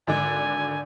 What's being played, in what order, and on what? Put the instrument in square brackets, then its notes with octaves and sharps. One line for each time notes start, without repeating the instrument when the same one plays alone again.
[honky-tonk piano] G#1 D3 D4 [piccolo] G#5